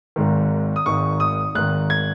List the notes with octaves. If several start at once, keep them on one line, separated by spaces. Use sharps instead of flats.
G#1 G#2 D#3
D#6
G#1 G#2 D#3 C#6
D#6
G#1 G#2 D#3 F#6
G#6